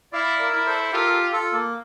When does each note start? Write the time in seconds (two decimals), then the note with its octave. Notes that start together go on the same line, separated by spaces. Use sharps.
0.12 E4 D5 F5
0.39 A#4 D5
0.52 E4
0.66 A4 C5
0.83 C5
0.92 F4 G4 A#4
1.06 A4
1.12 G4
1.32 F4 A4
1.53 A#3